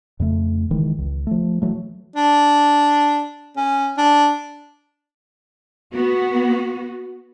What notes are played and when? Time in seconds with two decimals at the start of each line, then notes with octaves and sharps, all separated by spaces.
0.20 F2 C#3 A3
0.71 F#1 D#3 E3 G#3
0.99 C#2
1.27 F3 A3
1.62 E3 F#3 A3
2.16 D4
3.57 C#4
3.98 D4
5.92 B3 F#4